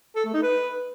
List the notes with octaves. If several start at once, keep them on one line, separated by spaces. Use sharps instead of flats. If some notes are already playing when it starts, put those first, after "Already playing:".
A4
A3
D#4
B4